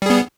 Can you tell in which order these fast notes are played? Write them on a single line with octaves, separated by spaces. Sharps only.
G3 G#4 B3